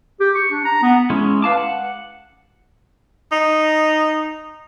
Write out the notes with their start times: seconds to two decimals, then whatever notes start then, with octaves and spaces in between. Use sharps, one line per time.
0.20 G4
0.35 C#6
0.51 D4
0.65 A#5
0.83 B3
1.10 G#3 C#4 E4
1.42 B4 F5 A5 D6
1.57 F#5
3.32 D#4